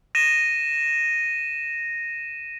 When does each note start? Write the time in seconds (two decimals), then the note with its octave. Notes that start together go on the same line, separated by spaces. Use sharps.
0.15 A#6 D#7 E7